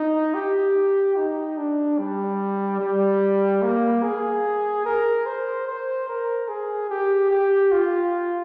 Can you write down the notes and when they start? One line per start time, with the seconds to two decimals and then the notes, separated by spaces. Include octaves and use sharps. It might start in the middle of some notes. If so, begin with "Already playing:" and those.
Already playing: D#4
0.34 G4
1.16 D#4
1.57 D4
1.98 G3
2.80 G3
3.62 A#3
4.03 G#4
4.85 A#4
5.26 C5
5.67 C5
6.08 A#4
6.48 G#4
6.90 G4
7.31 G4
7.72 F4